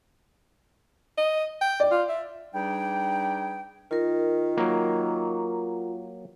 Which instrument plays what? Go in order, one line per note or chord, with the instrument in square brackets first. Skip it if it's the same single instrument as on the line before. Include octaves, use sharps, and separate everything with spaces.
[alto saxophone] D#5
G5
[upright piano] D5
[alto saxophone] F4
E5
[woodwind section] G3 D4 D#4 G#4 B4 G5
[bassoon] D#3 [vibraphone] F4 A#4
[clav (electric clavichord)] F#3 A#3